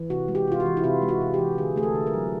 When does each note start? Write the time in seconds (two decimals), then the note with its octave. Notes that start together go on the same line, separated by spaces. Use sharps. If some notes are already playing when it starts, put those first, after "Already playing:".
Already playing: E3
0.10 C3 F#4
0.28 G#3
0.35 G4
0.48 C3 F4
0.60 F#4
0.66 E3
0.77 E4
0.84 C3 F4
1.02 G#3
1.08 F#4
1.21 C3
1.34 E3 G4
1.58 D3 G#4
1.76 A3 G#4
1.83 A4
1.95 D3
2.07 A#4
2.14 F#3